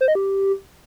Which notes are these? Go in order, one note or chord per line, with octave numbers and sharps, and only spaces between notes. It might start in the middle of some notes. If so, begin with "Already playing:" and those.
C5
D#5
G4